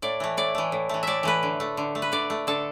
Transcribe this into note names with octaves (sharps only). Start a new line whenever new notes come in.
A2 D5
E3 A3
A2 D5
E3 A3
A2
E3 A3
A2 D5 E5
E3 A3 B4
D3
A3
D3
A3
B4
D3 D5
A3
D3 A4